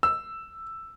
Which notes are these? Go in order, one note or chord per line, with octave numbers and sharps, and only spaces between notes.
E6